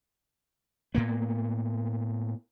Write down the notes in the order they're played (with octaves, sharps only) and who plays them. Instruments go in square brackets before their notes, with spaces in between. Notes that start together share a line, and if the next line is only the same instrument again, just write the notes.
[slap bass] A2 A#3 B3